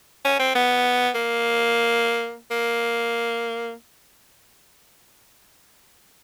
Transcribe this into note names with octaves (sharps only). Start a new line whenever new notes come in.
C#4
C4
B3
A#3
A#3